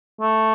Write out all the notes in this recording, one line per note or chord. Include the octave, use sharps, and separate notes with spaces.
A3